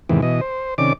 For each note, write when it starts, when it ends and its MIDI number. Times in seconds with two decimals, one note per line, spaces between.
0.09 0.21 40
0.09 0.21 44
0.09 0.21 48
0.09 0.21 51
0.09 0.21 52
0.22 0.41 47
0.22 0.41 52
0.22 0.41 75
0.41 0.74 72
0.78 0.93 48
0.78 0.93 51
0.78 0.93 61
0.78 0.93 74
0.78 0.93 86